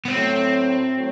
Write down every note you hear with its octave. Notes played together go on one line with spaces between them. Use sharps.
B3
A2 F#3 A3 C4
A2 F#3 A3